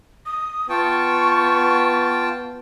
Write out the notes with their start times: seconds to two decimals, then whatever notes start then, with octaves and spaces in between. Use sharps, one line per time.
0.26 D#6
0.69 B3 F4 G5 A5 C#6